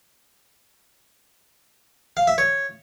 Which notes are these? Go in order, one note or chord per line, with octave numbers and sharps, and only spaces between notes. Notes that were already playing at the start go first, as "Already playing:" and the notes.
F5
E5
C#5